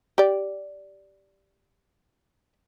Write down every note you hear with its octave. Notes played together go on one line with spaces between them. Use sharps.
G4 D5